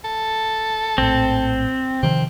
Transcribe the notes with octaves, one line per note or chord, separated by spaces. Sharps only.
A4
A#1 A2 C4
C3 D#3 F3 C4